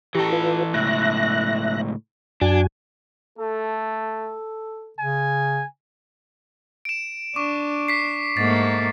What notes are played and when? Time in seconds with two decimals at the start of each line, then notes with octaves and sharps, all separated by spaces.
0.15 E3 G4 A4 A#5 C#6
0.32 F4 B4
0.74 C#2 A2 E5 F#6 A#6
2.41 F#2 D4 F#4 G#5
3.39 A3 A4
4.99 C#3 G#5
6.85 D7 E7
7.36 D4 C#6 D6
7.88 B6 C7
8.37 G#2 A3 A#3 A6